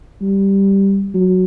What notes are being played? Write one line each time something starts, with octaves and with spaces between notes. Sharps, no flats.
G3
F#3